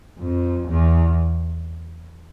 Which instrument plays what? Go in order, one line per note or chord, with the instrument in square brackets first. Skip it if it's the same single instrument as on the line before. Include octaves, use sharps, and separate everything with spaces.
[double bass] F2
E2